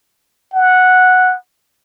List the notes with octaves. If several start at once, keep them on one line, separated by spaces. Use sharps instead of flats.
F#5